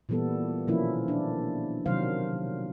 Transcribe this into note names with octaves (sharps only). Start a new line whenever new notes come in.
A#2 E3 G3 B3 A4
B2 D#3 F3 A#3 C#4 E4
D4
C3 D#3 F#3 C5 F5